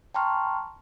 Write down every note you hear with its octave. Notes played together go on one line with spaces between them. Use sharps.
G5 A5 A#5 C6 C#6 F6